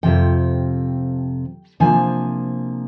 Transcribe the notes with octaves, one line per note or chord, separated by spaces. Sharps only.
F2 C3 F3 G5
C3 F3 A#3 D4 G#5